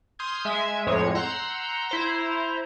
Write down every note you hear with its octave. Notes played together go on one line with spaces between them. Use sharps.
C6 D#6 F6 G6 G#6
G#3 E5 G#5 G#6
F2 A2 G#3 C#5 G#6
F#5 A#5 C6 E6 G6
E4 C5 A#5